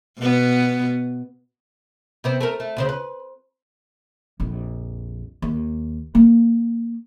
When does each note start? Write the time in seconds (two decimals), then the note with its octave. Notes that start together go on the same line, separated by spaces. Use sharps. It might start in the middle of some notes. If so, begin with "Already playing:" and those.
0.19 B2 B3
2.24 C3 B3 C4
2.40 A3 A4 A#4
2.60 A3
2.77 D2 C#3 C5
2.89 B4
4.40 A#1 F2
5.42 D#2
6.15 A#3